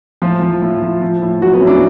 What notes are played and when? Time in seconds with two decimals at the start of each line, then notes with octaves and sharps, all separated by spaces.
0.22 A2 F3 F4
0.42 F3
0.62 A2
0.82 F3
1.02 F3
1.22 A2
1.42 A2 F#3 F#4
1.54 B3
1.60 A2 C#4
1.67 D4